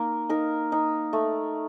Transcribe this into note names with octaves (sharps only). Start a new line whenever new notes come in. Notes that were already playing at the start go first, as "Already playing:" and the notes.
Already playing: A#3 D#4 A#4
D#4 A#4
D#4
A3